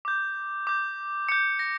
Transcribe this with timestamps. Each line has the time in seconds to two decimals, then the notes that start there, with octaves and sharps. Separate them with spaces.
0.05 D6 G6
0.67 D6 G6
1.29 D6 G6 C#7
1.59 A#6